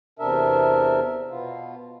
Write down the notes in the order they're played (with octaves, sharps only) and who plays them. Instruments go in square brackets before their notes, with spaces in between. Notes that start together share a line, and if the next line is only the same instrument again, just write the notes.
[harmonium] E2 C3 D4 A#4 E5
B2 B3 F4